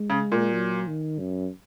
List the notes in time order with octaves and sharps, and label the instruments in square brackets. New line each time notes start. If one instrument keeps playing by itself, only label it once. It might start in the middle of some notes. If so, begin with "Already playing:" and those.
Already playing: [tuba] G#3
[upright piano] C#3
A#2
[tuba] F#3
D#3
F#2